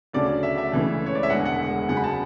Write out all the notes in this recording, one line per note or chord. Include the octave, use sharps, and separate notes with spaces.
D2 C#3 F#3 A3 D5
E5
E5
C#2 C#3 E3 A3
C#5
D5
E5
E1 E2 D3 G#3 F#5
F#5
F#2 C#3 G#3 F#5
B5
A5